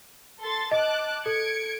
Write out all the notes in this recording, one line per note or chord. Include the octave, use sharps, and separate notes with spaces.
A4 C6 A6
D#5 A5 D6 F#6
A4 G#6 C#7 D7